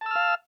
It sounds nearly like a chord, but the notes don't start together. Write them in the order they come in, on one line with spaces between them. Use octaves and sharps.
A5 E6 F6 F5